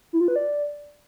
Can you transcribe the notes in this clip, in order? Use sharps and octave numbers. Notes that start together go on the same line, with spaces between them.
E4
F4
B4
D5